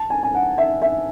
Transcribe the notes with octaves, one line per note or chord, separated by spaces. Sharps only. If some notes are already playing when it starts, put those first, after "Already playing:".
Already playing: A5
G#5
G#5
F#5
E5
E5